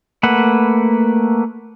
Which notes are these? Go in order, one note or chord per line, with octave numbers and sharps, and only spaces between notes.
A3 A#3 B4 F#5